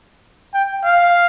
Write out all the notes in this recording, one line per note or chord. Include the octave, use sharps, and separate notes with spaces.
G5
F5